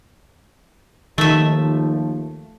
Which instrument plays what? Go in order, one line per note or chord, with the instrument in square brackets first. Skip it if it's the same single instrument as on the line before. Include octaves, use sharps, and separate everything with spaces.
[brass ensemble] D#2 F3 [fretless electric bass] D#3 [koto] A3 E5